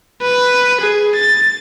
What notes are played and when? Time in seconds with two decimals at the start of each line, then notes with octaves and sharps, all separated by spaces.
0.22 B4
0.81 G#4
1.15 A6